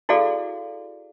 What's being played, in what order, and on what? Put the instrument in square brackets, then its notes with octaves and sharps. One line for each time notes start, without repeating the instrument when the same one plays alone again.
[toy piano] E4 F#4 G#4 A4 D5 F5